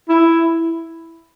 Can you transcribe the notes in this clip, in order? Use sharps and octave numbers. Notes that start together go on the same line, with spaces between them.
E4